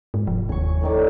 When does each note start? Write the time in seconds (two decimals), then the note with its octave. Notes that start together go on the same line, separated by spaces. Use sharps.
0.14 G#2
0.27 F1 F3
0.49 D#2 G#5 C#6
0.81 A2 D#3 D5